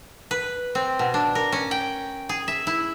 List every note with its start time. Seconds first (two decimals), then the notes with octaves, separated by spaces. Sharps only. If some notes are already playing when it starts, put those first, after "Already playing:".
0.31 B4
0.75 C4
0.99 B2
1.14 D4
1.35 A#4
1.52 C#4
1.71 G5
2.29 G#4
2.48 E5
2.67 E4